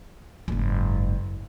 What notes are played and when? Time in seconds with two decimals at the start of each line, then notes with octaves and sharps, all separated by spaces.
0.48 F#1 G#2